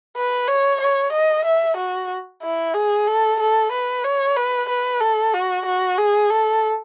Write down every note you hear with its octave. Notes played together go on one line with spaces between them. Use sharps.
B4
C#5
C#5
D#5
E5
F#4
E4
G#4
A4
A4
B4
C#5
B4
B4
A4
F#4
F#4
G#4
A4